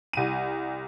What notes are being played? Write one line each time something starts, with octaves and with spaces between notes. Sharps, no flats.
C2 D#7